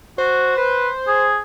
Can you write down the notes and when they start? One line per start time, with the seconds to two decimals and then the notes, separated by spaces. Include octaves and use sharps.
0.18 F#4 C5
0.57 B4
1.07 G#4